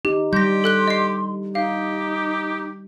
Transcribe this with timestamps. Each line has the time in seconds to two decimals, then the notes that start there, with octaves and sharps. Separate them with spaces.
0.05 D#4 G4
0.33 G3 G4 C6 G6 A#6
0.64 A4 F#6 G7
0.88 D#5 C7
1.55 D#4 G4 F5